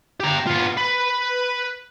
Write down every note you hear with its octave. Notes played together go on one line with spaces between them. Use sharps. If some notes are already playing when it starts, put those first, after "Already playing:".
G4 A#5
B3 F4
B4